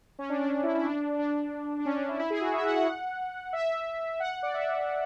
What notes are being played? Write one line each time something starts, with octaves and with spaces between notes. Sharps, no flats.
C#4
D4
D4
D4
E4
E4
D4
D4
D4
C#4
D4
E4
E4
G#4
F#4
E5
F#5
F#5
E5
F#5
D5
E5